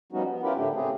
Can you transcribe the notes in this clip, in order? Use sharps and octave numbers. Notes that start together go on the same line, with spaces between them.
F3 G3 B3 C#4 D#4 F#4
B3
C#4 E4 F4 G4 A#4 B4
A2 D3 A3 D4 G4
C#3 A3 C4 G4 G#4